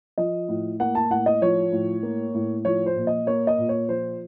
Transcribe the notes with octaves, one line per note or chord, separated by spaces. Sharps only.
F3 D#5
A2
A#3 F#5
A5
A2 F#5
D#5
F3 C#5
A2
A#3
A2
F3 C#5
C5
A#2
D#5
A#3 C#5
D#5
A#2
C#5
F3 C5